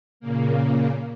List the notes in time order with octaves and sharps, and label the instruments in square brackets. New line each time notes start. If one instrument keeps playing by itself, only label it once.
[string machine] A#2 C#3 A#3